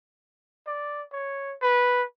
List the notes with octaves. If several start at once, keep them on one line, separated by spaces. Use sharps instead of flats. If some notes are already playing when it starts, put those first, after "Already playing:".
D5
C#5
B4